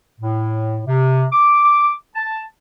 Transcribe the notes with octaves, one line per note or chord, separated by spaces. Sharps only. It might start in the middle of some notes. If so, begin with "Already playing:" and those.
A2
C3
D6
A5